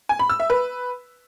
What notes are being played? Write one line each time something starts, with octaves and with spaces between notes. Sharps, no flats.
G#5
B5
E6
E5
B4